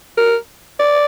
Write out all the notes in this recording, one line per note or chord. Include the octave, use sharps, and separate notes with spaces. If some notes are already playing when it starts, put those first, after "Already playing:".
A#4
D5